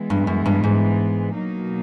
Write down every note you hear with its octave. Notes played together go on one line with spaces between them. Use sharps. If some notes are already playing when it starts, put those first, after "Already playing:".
Already playing: E3 G#3 B3
G2
F#2
G2
G#2
B2 F#3 A#3 D#4